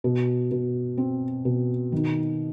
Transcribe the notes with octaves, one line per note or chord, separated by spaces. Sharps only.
B2
B2
C4
B2
D#3